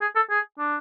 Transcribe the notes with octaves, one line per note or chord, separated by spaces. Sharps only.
G#4
A4
G#4
D4